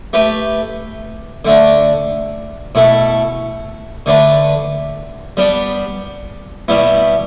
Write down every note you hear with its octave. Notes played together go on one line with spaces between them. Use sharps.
A3 G4 B4
D3 A3 D4
B2 A3 E4 A4
D3 A3 D4 B4
G3 B3 D4
B2 G3 B3 E4